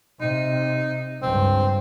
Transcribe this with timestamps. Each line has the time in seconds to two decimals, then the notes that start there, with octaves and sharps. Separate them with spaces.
0.21 C3 D#4
1.22 C#2 G2 C4